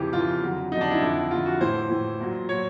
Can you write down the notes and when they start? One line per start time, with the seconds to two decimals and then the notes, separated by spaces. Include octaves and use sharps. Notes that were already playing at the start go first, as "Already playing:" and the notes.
Already playing: F2 C#3 E3 G4
0.12 F2 C#3 E3 F4
0.42 F2 D3 F#3
0.72 F2 D3 F#3 D#4
0.81 D4
0.91 E4
1.02 F2 D3 F3
1.31 F2 D3 F3 F4
1.46 F#4
1.61 A2 E3 C5
1.90 A2 E3
2.20 A#2 F#3
2.49 A#2 F#3 C#5